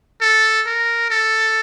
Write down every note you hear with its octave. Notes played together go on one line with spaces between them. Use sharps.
A4
A#4
A4